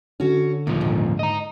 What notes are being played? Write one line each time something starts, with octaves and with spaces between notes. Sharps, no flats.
D3 C#4 F#4
D#2 A#2 F3 A3
G#2
D#5 A#5